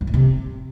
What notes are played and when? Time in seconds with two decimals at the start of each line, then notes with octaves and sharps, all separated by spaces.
0.01 G2
0.07 A2
0.14 C3